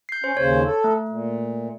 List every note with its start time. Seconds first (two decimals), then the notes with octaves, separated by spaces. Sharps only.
0.09 G6 C7
0.24 C#4 C5
0.37 D#2 C#3 C5 C#5
0.65 A4
0.84 A3
1.08 A#2